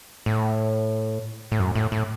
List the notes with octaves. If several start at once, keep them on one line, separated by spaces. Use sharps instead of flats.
A2
A2
F#2
A2
A2